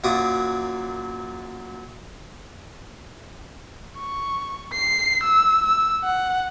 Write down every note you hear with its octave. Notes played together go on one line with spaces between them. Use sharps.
F#2 A#2 F#3 D6 D#6
C#6
C7
E6
E6
F#5